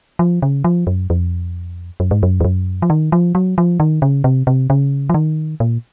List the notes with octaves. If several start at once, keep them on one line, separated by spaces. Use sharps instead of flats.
F3
C#3
F3
F#2
F2
F#2
G#2
F#2
F2
F#2
F3
D#3
F3
F#3
F3
D#3
C#3
C3
C3
C#3
F3
D#3
A#2